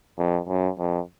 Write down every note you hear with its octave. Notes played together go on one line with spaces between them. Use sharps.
F2
F#2
F2